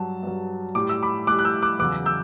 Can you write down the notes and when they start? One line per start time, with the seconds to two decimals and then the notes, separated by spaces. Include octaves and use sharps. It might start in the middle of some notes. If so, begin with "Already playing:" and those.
Already playing: G2 F#3 A5
0.23 G2 F#3
0.75 A2 G3 D6
0.89 E6
1.03 B5 D6
1.27 A2 G3 D6 F#6
1.39 F#6
1.45 E6 G6
1.62 D6 F#6
1.79 E2 C#3 F#3 D6 F#6
2.06 E6 G6